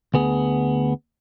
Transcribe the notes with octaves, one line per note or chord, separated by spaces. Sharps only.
D2 B3 G#4